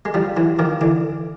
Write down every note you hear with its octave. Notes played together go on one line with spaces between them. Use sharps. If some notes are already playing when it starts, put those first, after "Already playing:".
G#3
F3 G3
E3 F#3
D#3 F3
D3 E3